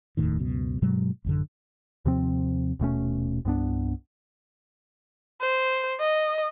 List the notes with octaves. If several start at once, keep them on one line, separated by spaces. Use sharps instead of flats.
F1 D#2 A2 D#3
C#2 F#2 B2
G2 B2 F#3 G#3
A1 F#2 D3
D#2 C3 F3 C4
D#1 B2 A3 C#4
C2 G2 B3 D4
C5
D#5